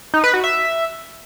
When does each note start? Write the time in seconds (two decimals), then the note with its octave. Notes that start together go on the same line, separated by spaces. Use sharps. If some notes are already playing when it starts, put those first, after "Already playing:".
0.14 D#4
0.24 B4
0.34 F#4
0.44 E5